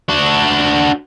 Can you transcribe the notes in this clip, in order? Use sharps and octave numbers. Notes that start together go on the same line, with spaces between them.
D4 F#4